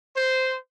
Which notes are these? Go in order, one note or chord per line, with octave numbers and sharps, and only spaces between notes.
C5